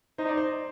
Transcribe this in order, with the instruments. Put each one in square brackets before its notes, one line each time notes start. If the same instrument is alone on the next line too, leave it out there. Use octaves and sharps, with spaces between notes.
[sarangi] D#4 [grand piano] C5
[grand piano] D5
C5